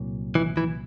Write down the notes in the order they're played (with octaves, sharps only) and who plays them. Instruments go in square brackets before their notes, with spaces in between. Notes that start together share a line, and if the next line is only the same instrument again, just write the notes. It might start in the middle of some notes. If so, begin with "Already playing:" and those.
Already playing: [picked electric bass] C2 A#2 F#3
[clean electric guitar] E3
E3